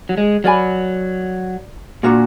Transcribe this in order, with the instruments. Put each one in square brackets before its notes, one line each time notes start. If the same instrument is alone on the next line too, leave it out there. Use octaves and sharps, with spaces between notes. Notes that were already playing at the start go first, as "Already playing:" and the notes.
[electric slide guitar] F#3
G#3
[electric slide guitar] F#3 [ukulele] A#4 D5 G#5 B5
[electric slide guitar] A#2 [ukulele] D4 F#4 A#4